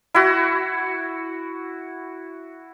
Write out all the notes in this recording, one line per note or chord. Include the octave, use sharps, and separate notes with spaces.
E4 F#4